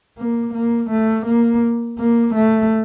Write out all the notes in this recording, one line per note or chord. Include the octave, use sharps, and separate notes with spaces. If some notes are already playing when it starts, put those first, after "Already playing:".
A#3
A#3
A3
A#3
A#3
A3